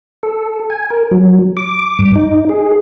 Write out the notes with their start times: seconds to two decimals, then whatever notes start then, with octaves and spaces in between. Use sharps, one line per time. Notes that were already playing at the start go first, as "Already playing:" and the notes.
0.23 A4
0.70 G#5
0.90 A#4
1.11 F#3
1.57 D6
1.99 G2
2.15 D#4
2.49 G#4